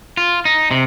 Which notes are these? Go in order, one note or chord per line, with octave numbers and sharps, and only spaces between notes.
F4
D#4
C3